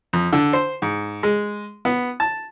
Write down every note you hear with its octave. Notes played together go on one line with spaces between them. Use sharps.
F2
D3
C5
G#2
G#3
B3
A5